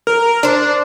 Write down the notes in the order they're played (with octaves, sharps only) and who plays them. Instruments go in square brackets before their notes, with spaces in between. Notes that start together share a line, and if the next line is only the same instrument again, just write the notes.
[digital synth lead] A#4
[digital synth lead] D4 [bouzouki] C5 D5